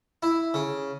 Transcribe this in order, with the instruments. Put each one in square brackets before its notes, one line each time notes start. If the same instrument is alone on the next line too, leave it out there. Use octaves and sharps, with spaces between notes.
[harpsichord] E4
C#3